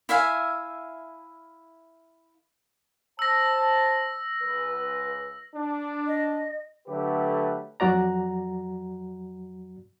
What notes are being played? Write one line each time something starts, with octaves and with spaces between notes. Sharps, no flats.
E4 E5 F5 G#5
C5 A5 E6 A#6
C#2 B4
D4
D#5
D3 F#3 A3 G4 B4
F2 F#3 F#4 D5 A#5